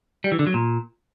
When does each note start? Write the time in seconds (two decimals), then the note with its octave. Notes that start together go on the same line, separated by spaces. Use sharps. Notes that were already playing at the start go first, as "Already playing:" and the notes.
0.24 G3
0.32 E3
0.39 D3
0.47 F#3
0.54 A#2